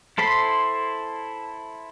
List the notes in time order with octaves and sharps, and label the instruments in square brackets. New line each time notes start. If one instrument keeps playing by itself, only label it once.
[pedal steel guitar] E4 A4 C5 B5 C6